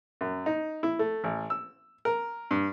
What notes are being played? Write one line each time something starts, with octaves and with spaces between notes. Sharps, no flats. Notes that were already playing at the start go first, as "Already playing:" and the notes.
F#2
D#4
E4
A3
A1
E6
A#4
G2